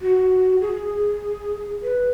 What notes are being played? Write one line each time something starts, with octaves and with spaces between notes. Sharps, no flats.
F#4
G#4
B4